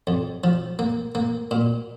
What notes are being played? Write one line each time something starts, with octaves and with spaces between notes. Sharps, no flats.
F2
F3
A#3
A#3
A#2